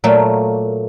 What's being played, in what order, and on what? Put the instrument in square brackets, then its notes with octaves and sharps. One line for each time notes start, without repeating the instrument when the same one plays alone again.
[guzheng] A#2 F#3 A3 A#3